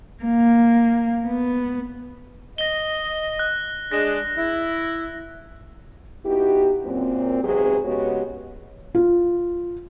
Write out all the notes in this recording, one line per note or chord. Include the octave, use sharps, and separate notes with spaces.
A#3
B3
D#5 A#6 G7
F#6
G#3 D4 A#6
E4
B3 D#4 E4 F#4 G4
F#2 A#2 C4
E2 G#2 C3 F#3 B3 G#4
C#3 G#3 B3 F#4 G4 C#5
F4